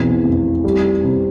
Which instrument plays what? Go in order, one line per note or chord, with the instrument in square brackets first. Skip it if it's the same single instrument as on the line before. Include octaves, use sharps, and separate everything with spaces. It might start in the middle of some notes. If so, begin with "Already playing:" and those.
Already playing: [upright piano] B1 E2 [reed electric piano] C4 E4
[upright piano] F1
G3
C3